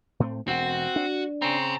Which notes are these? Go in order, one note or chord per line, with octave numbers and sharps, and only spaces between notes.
A2 A3 C4
E1 C4 F#4 F#5
D4
C#3 C4 G#5 A#5